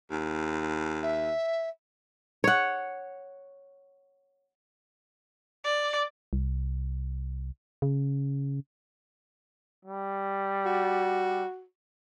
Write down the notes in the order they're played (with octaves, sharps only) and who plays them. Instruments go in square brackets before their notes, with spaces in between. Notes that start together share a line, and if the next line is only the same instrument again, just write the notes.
[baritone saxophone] D#2
[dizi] E5
[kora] C#5 F#5
[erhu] D5
[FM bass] C2
C#3
[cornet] G3
[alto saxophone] F#4